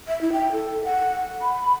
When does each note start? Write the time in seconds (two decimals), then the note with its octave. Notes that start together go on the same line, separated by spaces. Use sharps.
0.08 E5
0.21 E4
0.33 G5
0.52 A4
0.85 F#5
1.41 B5